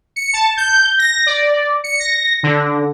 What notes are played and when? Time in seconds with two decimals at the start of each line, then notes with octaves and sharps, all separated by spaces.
0.16 C#7
0.33 A5
0.57 G6
0.99 A#6
1.26 D5
1.84 C#7
2.00 A#6
2.43 D3